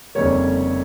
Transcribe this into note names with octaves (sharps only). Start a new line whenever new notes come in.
F1 F2 C#3 G3 A#3 C#5